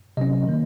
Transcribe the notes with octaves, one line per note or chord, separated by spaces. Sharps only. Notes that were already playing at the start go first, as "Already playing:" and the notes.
C3 F#3 C#4 D#5
D#3 A#3